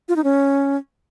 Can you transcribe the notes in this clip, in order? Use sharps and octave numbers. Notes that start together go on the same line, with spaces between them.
F4
D#4
C#4